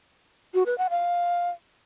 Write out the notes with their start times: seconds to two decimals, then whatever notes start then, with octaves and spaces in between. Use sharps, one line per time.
0.54 F#4
0.66 B4
0.78 F#5
0.90 F5